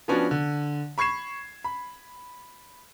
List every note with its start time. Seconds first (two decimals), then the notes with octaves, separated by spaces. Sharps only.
0.08 F3 B3 C#4 D4 F#4
0.31 D3
0.98 B5 C#6 G#6 C7 E7
1.64 B5